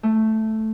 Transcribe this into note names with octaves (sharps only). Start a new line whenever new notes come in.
A3